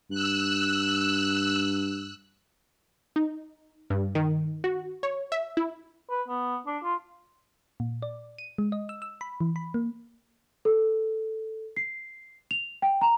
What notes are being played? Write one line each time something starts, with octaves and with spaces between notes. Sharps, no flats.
G2 E6 F#6
D#4
G2
D#3
F#4
C#5
E5
E4
B4
B3
D4
F4
A#2
D5
D#7
G#3
D#5
E6
E6
B5
E3
B5
A#3
A4
C7
F7
G5
A#5